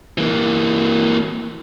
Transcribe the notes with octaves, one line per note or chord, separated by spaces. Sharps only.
E3 A#3